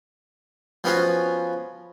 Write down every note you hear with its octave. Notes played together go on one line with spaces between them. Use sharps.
F3 B3 C#4 F4 F#4